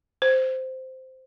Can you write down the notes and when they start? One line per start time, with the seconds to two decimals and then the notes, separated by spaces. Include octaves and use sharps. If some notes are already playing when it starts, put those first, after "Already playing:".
0.22 C5